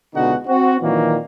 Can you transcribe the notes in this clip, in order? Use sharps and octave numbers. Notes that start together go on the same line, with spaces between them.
C#2 B2 D3 D#4 F#4 F#5
C4 F#4
A#2 D#3 E3 F#3 A#3